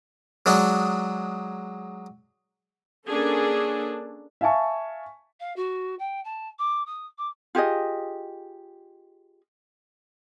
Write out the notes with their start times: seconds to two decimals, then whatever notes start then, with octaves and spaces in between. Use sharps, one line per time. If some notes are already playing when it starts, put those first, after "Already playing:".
0.46 F#3 G#3 D4 D#4
3.09 A#3 C#4 D4 G#4 A4
4.41 E5 F5 G#5 A5 C#6
5.40 F5
5.56 F#4
5.99 G5
6.24 A5
6.59 D6
6.86 D#6
7.18 D6
7.55 F4 G4 G#4 D#5